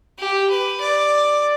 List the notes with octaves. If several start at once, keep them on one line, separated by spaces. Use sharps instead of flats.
G4
B4
D5